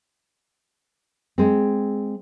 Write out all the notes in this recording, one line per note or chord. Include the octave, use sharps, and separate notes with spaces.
G#3 C4